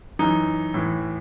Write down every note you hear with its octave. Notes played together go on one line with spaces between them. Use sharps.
F#2 E3 D#4
A2 E3